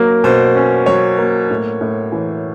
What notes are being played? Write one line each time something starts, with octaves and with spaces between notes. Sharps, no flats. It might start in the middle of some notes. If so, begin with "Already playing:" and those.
Already playing: B2 F#3 A#3
B2 C5
C#4
F#3 C#5
A#3
A2
A2
E3